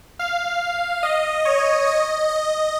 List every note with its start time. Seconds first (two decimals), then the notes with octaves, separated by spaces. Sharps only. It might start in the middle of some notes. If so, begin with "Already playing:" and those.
0.19 F5
1.03 D#5
1.45 C#5
1.87 D#5
2.29 D#5